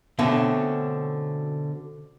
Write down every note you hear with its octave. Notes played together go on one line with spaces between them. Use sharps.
B2 D3 A3 C4 C#4